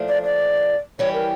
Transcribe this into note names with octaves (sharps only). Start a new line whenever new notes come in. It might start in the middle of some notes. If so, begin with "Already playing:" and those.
Already playing: A#2 F3 A3 D4
D5
D5
E3 G3 C#4 G4 C#5
A#4